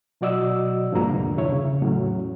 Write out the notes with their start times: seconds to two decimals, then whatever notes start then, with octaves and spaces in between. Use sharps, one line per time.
0.21 B2 F#3 F#4 D5 D#5 E6
0.92 C#2 G2 F3 G#3 A#3 A#5
1.08 C2 F2 A2 D3
1.37 E2 G2 E4 C#5
1.52 C#3
1.82 E2 A2 F#3 C#4